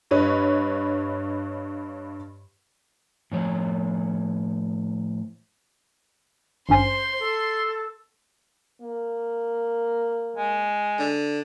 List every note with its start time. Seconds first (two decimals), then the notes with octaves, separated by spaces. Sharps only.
0.11 G2 B4 C#5 D#5
3.32 A2 F3 C#5
6.69 G#1 G2 C#4 C5 C6
7.19 A4
8.81 A#3
10.36 G#3
10.99 D3